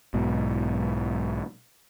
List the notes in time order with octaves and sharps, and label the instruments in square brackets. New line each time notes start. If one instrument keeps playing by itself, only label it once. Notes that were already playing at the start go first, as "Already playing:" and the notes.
[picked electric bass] B1 G#2 B2